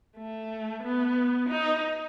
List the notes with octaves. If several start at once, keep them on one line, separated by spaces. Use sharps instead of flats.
A3
B3
D#4